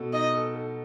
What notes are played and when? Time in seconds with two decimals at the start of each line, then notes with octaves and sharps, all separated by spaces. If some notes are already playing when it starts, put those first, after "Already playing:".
Already playing: B2 A4
0.13 D#4 D#5
0.35 A4
0.55 A4